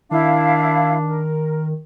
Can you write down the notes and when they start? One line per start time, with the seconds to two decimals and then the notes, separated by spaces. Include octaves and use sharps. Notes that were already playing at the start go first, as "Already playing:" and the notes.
0.11 D#3 D4 E4 F5
1.06 A#4